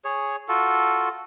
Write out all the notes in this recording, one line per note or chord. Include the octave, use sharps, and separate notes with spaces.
G#4 C#5
F4 F#4 A4